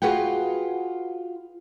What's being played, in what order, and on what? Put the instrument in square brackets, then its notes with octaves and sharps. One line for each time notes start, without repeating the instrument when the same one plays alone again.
[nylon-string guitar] F4 F#4 G#4 B4 F#5 G5